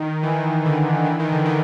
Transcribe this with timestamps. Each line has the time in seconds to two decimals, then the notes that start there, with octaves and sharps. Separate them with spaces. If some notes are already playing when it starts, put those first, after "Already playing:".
Already playing: D#3
0.23 E3
0.66 D3
1.06 E3
1.20 D#3
1.32 D3
1.46 D#3